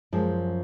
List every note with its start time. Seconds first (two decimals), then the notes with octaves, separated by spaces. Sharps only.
0.13 F#2 F3 G#3